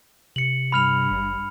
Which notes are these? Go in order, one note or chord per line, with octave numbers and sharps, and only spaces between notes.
C3 C#7 F#7
G2 B5 F6 F7
G#1